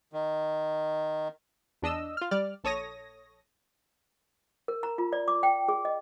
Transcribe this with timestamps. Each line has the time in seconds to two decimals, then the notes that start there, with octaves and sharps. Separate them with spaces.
0.13 D#3
1.82 E2 D4 D#5 E6
2.17 F4 F6
2.31 G3 D5 F6
2.64 A#1 A4 C#5 D#6 A#6
4.68 A#4
4.83 A#5
4.98 F4
5.13 D5
5.28 D6
5.43 G5
5.69 G#4
5.85 D#5